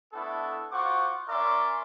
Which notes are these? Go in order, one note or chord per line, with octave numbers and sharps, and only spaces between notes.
A3 B3 D4 E4 A4
F4 F#4 C5 F#5 C#6 D6
C#4 A#4 D5 E5 C6 D6